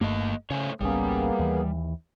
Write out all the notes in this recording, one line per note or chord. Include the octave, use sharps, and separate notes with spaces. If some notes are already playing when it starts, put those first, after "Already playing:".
G1 G2 A3 A#3 D#5
C#3 A3 C5 C#5
G#1 C#2 G3 A#3 B3 C#4 G#4
D#2 E3